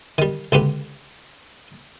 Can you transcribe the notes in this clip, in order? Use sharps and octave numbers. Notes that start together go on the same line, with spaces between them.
D#3 G3
C#2 D3 G4 B4